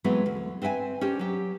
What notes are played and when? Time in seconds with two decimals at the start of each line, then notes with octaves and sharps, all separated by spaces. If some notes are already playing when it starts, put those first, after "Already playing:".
0.04 E3 F#3 G#3 A3 B3 C4
0.26 D2
0.62 C4 B4 E5 G5 G#5
1.01 C#4 D4 G4 C5
1.19 F#3 G4